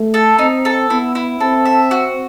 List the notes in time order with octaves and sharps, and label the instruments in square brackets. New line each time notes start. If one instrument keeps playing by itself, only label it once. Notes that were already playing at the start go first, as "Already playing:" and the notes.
Already playing: [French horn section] A3
[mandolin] A4
[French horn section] C4 [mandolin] D#4
[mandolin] A4
[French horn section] B3 [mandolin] E4
[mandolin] E4
[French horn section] C4 [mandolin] A4
[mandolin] E5
F#4